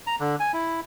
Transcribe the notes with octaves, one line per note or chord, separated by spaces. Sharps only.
A#5
D3
G#5
E4